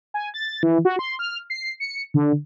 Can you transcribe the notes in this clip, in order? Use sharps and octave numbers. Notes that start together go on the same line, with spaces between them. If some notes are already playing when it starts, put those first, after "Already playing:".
G#5
A6
E3
F#4
C6
F6
C7
C#7
D3